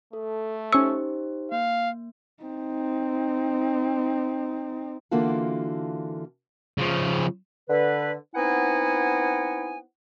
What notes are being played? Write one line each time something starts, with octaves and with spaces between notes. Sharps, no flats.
A3 A4
C#4 D#4 G4 C5 C#6 E6
A#3 F5
C4 D#4
D3 E3 A#3 F4 F#4 A4
C#3 F3
D3 B4
B3 C4 D#4 E4 F#5 G#5